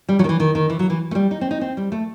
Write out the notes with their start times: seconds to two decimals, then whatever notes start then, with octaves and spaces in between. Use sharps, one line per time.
0.09 G3
0.19 F#3
0.24 D#3
0.29 E3
0.40 D#3
0.55 D#3
0.70 E3
0.79 F#3
0.90 E3
1.11 A3
1.15 G3
1.31 D#4
1.41 C4
1.51 D#4
1.61 C4
1.77 G3
1.92 A3